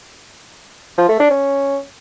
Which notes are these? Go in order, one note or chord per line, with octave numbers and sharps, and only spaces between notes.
F3
A3
D4
C#4